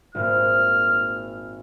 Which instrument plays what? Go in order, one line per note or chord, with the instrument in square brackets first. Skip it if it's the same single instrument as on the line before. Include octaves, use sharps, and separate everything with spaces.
[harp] G#1 A#2 [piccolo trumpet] F6